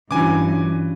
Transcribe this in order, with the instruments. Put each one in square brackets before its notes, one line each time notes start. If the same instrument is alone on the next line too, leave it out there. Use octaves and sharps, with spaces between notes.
[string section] G2 [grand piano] E3 F#3 [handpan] C#4 D4 F4 [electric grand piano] G#5 D6